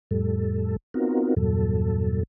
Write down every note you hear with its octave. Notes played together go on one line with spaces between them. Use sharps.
F2 A2 G3 A4
B3 C4 D#4 F4 F#4 A#4
E2 G2 A#2 F#3 A4